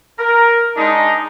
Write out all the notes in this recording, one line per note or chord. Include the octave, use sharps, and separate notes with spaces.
A#4
G#3 D4 D#4